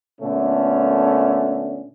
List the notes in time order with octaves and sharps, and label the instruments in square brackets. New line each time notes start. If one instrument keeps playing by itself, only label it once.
[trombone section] A#2 D3 A3 B3 C#4